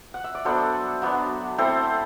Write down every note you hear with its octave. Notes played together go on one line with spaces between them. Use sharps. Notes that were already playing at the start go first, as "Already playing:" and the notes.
F#5
E5
D5
F#3 B3 D4 A4 C5
F#3 B3 D4
A3 C4 E4 A4 C5